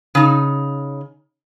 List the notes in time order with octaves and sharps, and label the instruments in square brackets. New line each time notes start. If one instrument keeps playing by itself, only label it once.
[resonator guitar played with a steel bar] C#3 D#4